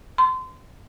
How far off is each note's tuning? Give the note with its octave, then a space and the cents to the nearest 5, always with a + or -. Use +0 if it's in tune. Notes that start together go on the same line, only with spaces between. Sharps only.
C6 -30